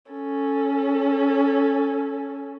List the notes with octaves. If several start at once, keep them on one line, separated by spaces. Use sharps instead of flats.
C#4 A4